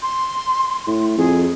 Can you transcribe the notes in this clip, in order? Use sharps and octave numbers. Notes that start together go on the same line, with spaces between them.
C6
A2
F2 G#4